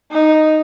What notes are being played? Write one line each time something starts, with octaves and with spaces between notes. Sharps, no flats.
D#4